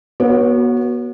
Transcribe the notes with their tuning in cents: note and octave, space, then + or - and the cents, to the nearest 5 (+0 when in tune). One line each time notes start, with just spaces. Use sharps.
B3 -35 F#4 +10 C#5 +0